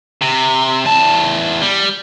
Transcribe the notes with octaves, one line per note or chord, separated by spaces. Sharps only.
C3
E2 A5
G3